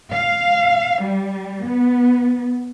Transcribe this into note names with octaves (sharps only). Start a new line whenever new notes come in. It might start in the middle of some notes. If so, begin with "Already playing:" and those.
F5
G3
B3